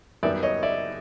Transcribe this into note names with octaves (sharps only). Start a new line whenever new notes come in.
F#2 D#3 G3 B3 D5 E5
C#5 D#5
D5 E5